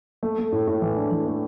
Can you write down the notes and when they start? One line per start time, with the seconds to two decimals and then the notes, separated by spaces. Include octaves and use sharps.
0.23 A3
0.38 A3
0.52 A2
0.67 A2
0.82 E3
0.96 D4
1.11 E3
1.26 A3